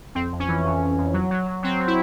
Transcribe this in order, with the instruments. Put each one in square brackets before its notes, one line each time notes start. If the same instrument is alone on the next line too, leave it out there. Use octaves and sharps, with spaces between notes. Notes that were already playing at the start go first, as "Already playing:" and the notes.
[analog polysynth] F2 C4
F2
C#4
E3
F2
F2
F2
F#3
F#3
F#3
F#3 C4
F#3
E4